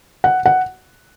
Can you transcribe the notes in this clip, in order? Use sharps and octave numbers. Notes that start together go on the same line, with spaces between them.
F#5
F#5